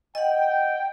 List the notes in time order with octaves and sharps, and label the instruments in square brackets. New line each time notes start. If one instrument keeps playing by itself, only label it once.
[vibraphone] D#5 F#5 [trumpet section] G5